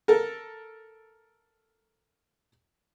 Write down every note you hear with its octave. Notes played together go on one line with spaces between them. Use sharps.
A4 A#4